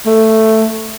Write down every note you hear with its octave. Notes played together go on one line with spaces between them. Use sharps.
A3